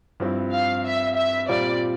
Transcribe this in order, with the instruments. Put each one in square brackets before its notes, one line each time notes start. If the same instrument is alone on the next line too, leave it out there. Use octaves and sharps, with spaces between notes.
[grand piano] G2 F3 C4 E4
[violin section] F5
E5
E5
[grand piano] A#2 G3 C4 F4 [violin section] D5